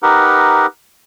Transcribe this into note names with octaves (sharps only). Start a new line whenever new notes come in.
D#4 G4 A#4 B4 F#5